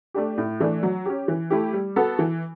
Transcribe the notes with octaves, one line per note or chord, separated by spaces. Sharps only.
A3 D4 G4
A2
E3 A3 D4
F#3
C#4 G4
E3
A3 E4 G4
G3
B3 F#4 A4
E3